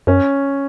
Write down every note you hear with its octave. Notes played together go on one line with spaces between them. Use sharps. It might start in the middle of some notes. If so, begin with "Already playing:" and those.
F#2 C#4